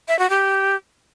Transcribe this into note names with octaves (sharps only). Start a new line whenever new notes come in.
E5
F#4
G4